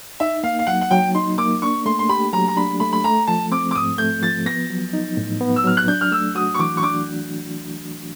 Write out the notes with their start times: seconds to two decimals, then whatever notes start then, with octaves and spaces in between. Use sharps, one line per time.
0.20 D#4 E5
0.43 A#3 F5
0.59 F5
0.67 F#3 F#5
0.81 F#5
0.91 F#3 G5
1.15 D#4 C6
1.38 A#3 D6
1.62 D4 C#6
1.86 A3 C6
1.99 C6
2.09 G4 B5
2.33 F#3 A#5
2.48 A#5
2.57 D4 B5
2.80 A3 B5
2.93 B5
3.04 A3 A#5
3.28 F3 A5
3.52 C4 D6
3.71 D6
3.75 G#2 D#6
3.98 A3 G6
4.22 F3 A6
4.46 B3 A#6
4.70 F#3
4.93 D#4
5.17 A2
5.41 B3
5.56 E6
5.64 F#3 F6
5.77 F#6
5.88 D4 G6
6.01 F6
6.12 A3 E6
6.35 F#4 D#6
6.55 C#6
6.59 E3 D6
6.77 C#6
6.83 D4 D6